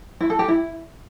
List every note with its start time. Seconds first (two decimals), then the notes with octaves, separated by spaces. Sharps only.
0.21 E4
0.30 A4
0.39 G4
0.48 E4